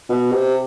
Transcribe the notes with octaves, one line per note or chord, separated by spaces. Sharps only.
B2
C3